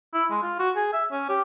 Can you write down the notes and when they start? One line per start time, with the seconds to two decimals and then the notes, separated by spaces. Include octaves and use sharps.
0.14 E4
0.31 G#3
0.43 F4
0.60 F#4
0.76 G#4
0.93 E5
1.12 C#4
1.29 G4